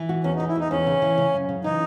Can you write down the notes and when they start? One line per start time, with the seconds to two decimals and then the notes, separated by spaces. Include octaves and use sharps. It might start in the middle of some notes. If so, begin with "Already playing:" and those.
Already playing: E3
0.09 F#4
0.24 E2 C#4
0.36 D#4
0.40 E3
0.48 E4
0.55 E2 D#4
0.71 E2 C#4
0.87 C#3
1.02 E3
1.18 C#3
1.33 F#2
1.49 C#3
1.64 E3 D#4